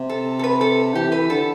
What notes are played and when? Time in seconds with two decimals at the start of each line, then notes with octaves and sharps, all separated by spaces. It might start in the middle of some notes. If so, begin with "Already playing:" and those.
Already playing: C3
0.09 A4
0.39 A4
0.44 B4
0.61 A4
0.95 E3 G4
1.12 B4
1.30 D3 A4